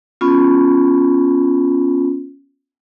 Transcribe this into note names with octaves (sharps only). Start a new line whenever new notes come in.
B3 C#4 F4